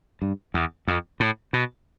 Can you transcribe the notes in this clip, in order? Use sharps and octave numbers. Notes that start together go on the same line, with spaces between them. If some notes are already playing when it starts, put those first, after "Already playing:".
G2
E2
F2
A2
B2